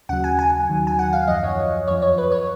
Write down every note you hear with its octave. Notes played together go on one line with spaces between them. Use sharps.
D#2 C#3 F#3 F#5
G#5
G#5
D#2 D#3 F#3
G#5
F#5
F5
F#2 F3 D#5
C#5
F2 F3 C#5
C#5
B4
C#5